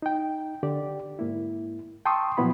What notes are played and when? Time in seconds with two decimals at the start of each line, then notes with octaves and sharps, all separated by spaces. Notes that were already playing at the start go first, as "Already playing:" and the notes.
0.02 D#4 G5
0.63 D3 G4 D5
1.19 G#2 A#3 E4
2.06 G5 A5 C6 C#6 D#6 E6
2.37 A#2 F3 F#3 B3 E4 B5